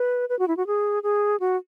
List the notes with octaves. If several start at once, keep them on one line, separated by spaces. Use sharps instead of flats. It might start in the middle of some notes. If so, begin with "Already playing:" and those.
Already playing: B4
B4
F#4
E4
F#4
G#4
G#4
F#4